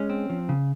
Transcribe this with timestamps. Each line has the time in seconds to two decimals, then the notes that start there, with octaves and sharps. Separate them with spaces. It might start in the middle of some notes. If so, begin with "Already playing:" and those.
Already playing: G#3 C#4
0.10 C4
0.30 F3
0.49 C#3